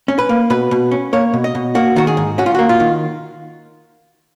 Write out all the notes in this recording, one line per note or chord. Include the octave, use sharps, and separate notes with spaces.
C#4
B4
A#3
B2 B4
B2
C#4
A#3 C#5
B2
D#5
B2
A#3 F#4
D#3 F#4
G#4
G#2
C#4 F#4
F4
A#3 F#4
F4
D#3